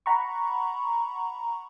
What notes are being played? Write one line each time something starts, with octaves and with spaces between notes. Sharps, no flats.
F#5 A#5 B5 C#6